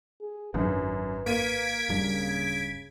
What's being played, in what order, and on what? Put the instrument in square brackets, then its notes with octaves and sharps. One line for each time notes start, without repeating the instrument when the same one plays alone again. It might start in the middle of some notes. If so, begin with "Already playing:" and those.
[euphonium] G#4
[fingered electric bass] G#1 D#3 D4 [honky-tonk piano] F#2 [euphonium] B4
[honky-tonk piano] A#3 D#7 [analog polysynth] G#6 B6 D7
[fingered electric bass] D1 G2 G3 [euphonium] C#3